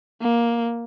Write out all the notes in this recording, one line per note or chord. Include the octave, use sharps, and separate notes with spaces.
A#3